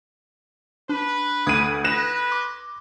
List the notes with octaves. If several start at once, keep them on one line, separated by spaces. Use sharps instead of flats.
D4 B4
D2 D#6 G#6 D#7
B4 F#6 A#6 E7
C6 D6